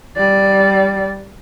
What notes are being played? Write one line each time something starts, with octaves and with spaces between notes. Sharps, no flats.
G3 D5